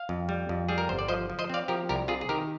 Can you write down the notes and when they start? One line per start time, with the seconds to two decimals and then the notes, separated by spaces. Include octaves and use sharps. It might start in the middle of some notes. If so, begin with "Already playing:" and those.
Already playing: F5
0.09 F2
0.29 G3
0.49 F2
0.69 G3 G#4
0.78 A#4
0.89 G1 C5
0.99 D5
1.08 F3 C5 D#5
1.30 F3
1.39 C5 D#5
1.50 C4 D5 F5
1.68 F3 G4 A#4
1.89 C2 G4 A#4
2.08 C3 F4 G#4
2.21 G#4
2.29 D#3 G4 A#4